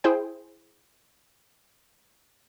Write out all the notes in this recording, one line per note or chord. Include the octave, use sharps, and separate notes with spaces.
E4 G#4 C5 G5